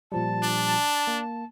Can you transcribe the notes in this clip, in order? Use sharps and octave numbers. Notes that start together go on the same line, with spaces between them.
A#2 F3 G3 A5
D4
A#3